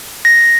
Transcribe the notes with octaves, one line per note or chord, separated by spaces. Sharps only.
A#6